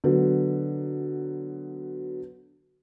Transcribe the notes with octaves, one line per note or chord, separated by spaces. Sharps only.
D3 F#3 B3